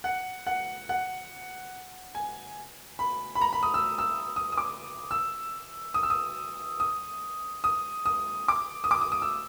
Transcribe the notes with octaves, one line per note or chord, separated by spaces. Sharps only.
F#5
F#5
F#5
G#5
B5
B5
A#5
B5
D#6
E6
E6
D#6
D#6
D6
E6
D#6
E6
D#6
D#6
D#6
D#6
D6
D#6
D6
D#6
D#6
E6